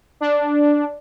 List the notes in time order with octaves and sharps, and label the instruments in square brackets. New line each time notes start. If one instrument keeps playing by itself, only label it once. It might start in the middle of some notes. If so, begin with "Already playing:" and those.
[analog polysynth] D4